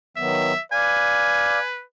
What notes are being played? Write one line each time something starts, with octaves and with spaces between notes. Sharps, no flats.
D#3 F#3 B3 E5
B4 D5 F5 G#5